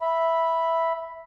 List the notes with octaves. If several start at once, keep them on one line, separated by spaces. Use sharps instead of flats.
E5 B5